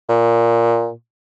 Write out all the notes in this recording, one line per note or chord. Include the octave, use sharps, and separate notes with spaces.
A#2